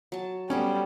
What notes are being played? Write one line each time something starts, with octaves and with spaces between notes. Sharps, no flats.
F#3 A5
G3 B3 C#4 A4 C5